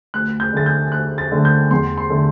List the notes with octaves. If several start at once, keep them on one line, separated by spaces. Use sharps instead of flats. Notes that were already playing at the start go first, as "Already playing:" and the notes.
D2 F#6
G6
D3 A3 A6
G6
D2 F#6
A6
D3 A3
G6
E2 C6
C6
D3 A3